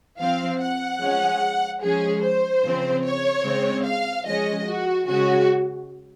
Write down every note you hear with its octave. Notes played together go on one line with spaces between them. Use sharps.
F3 C4 F5
F#5
F3 G#3 C#4
F3 G#3 C#4 G#4
C5
C#3 F3 C4
C#5
C#3 G#3 C4
F5
F3 G#3 C#4 D#5
F#4
C#3 G#3 C#4 F#4